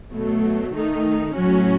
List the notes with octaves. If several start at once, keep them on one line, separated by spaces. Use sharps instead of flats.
B2 F#3 A3
D#3 A3 D#4
A2 F#3 C#4 F#4